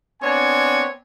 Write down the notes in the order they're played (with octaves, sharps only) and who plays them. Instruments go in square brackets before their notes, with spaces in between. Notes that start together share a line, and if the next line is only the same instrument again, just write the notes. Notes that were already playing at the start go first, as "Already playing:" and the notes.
[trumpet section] B3 C4 D4 C#5 G#5